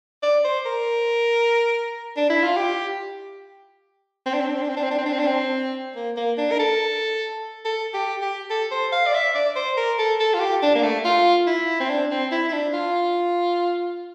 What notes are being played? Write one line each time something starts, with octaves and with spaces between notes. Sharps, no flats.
D5
C5
A#4
D4
E4
F4
G4
C4
D4
C4
D4
C4
D4
C4
D4
C4
D4
C4
D4
C4
D4
C4
A#3
A#3
D4
A#4
A4
A4
G4
G4
A4
C5
F5
D5
E5
D5
C5
A#4
A4
A4
F4
G4
D4
A#3
A3
F4
E4
C4
D4
C4
E4
E4
D4
F4